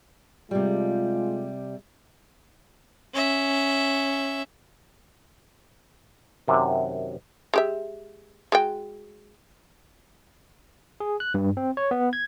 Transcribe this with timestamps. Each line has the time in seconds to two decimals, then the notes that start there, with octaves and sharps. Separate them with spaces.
0.51 C3 G3 G#3 F4
3.14 C#4 E5
6.48 F#2 C3 D#3
7.54 G#3 G4 E5
8.52 G#3 F#4 G5
11.00 G#4
11.20 F#6
11.34 G2
11.57 C4
11.77 C#5
11.91 B3
12.13 G#6